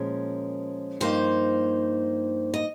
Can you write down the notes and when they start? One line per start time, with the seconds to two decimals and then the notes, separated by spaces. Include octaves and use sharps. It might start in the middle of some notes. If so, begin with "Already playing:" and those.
Already playing: A#2 F3 G#3 C#4 A#4
1.00 G2 F3 A#3 D#4 C5
2.54 D#5